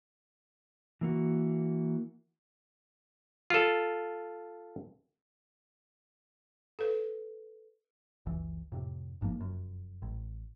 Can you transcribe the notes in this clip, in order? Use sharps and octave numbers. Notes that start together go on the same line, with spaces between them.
E3 A#3 F#4
F4 A4
A4 B4
F#1 C#2 E3
F2 A2 C3
G1 G#2 F3 A#3
F1 F#2
A1